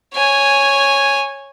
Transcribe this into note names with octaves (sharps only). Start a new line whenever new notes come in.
C#5 G#5